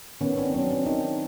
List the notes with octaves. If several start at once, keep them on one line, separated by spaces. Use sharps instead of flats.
D#3 B3 C#4
C4 D4
F#3 B3 C#4
C4 D4
D#3 C#4 D#4